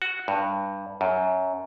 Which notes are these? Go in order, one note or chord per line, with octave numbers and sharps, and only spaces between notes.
F#4
G2
F#2